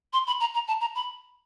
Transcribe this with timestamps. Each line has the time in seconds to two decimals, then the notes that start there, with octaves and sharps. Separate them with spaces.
0.13 C6
0.26 B5
0.40 A#5
0.54 A#5
0.67 A5
0.80 A#5
0.95 B5